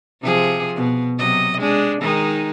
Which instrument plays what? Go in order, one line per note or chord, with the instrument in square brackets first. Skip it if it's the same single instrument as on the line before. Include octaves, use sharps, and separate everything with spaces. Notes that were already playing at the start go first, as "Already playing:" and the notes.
[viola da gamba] C3 F3 G#4
B2
C3 F#3 D#5
G#3 D4
D#3 G#3 D#4